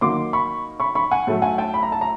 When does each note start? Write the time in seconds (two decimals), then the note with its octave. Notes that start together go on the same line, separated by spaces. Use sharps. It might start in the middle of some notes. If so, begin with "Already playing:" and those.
0.01 D#3 F#3 A#3 C6 D6
0.33 B5 C#6
0.80 B5 C#6
0.95 B5 C#6
1.11 F#5 G#5
1.27 A2 F#3 A3
1.42 F#5 G#5
1.58 G5 A5
1.74 B5
1.83 A#5
1.92 A5
2.01 A#5